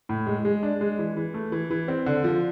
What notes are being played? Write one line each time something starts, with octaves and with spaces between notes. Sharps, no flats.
A2
G#3
G#3
D4
G#3
E3
E3
A3
E3
E3
C4
D3
F3